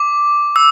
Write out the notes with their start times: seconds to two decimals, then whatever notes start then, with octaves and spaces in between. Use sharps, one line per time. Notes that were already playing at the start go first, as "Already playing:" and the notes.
Already playing: D6
0.56 E6